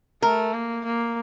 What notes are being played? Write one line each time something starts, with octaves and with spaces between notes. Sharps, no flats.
A3 A#4
A#3
A#3